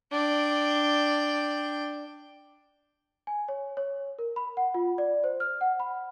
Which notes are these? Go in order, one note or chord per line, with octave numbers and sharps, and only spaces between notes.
D4 G5
G#5
C#5
C#5
A#4
B5
F#5
F4
D5
C5
F6
F#5
B5